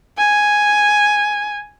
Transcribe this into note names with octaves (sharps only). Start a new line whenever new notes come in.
G#5